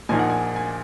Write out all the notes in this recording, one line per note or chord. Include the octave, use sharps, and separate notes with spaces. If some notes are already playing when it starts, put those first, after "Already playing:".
A#1 A#2 F3 A#3 D#4 G#5
F#5
G#5
G#5